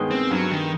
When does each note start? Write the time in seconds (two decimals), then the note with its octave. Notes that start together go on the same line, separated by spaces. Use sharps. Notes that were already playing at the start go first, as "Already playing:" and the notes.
Already playing: G2 D#3 G#3 B3
0.11 C4
0.31 G2 F#3
0.51 D#3